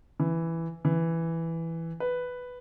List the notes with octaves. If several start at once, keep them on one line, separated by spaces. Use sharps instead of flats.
E3
E3
B4